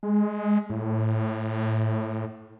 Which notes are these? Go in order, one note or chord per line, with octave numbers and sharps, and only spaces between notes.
G#3
A2